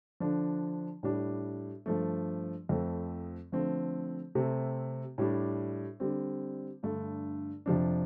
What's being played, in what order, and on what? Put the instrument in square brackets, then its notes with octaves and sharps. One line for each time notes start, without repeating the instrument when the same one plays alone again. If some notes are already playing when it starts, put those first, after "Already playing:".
[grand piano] D3 F3 D4
A2 G3 D4
G2 F3 A3
F2 F3 A3 C4
D3 F3 A3 C4
C3 A3 C4
A2 G3 D4
D3 G3 C4
G2 D3 A3
F2 C3 F3 D4